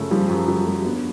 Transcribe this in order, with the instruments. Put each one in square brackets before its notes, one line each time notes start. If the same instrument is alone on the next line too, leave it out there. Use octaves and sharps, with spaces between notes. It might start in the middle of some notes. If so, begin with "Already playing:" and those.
Already playing: [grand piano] F#2 C#3 F3 A3
[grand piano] F3 [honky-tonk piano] G3
[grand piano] F#2
[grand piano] C#3 [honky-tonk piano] F#3
[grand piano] A3
[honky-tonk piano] B3 [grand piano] D4